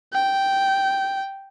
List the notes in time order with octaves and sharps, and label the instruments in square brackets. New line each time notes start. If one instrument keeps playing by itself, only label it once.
[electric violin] G5